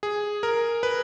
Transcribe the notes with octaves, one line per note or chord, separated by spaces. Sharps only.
G#4
A#4
B4